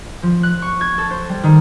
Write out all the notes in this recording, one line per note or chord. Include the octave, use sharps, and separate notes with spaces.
F3
F#6
C#6
G#6
A4
C5
G3
D#3